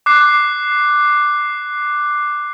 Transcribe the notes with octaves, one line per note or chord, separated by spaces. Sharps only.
D6 F#6 C7